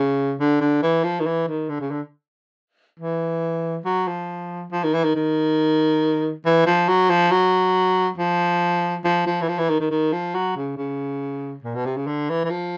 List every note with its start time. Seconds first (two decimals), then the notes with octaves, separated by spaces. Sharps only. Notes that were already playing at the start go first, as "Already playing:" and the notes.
Already playing: C#3
0.40 D3
0.61 D3
0.83 E3
1.04 F3
1.20 D#3
1.26 E3
1.48 D#3
1.69 D3
1.80 C#3
1.91 D3
3.00 E3
3.85 F#3
4.07 F3
4.72 F3
4.84 D#3
4.94 E3
5.04 D#3
5.15 D#3
6.46 E3
6.66 F3
6.89 F#3
7.10 F3
7.31 F#3
8.18 F3
9.04 F3
9.26 F3
9.42 E3
9.49 F3
9.59 E3
9.70 D#3
9.80 D#3
9.91 D#3
10.13 F3
10.35 F#3
10.56 C#3
10.77 C#3
11.64 A#2
11.75 B2
11.85 C3
11.97 C#3
12.07 D3
12.30 E3
12.44 E3
12.50 F3